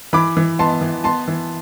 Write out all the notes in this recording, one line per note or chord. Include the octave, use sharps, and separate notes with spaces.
E3 B5 D6
E3
B3 A5 C6
E3
B3 A5 C6
E3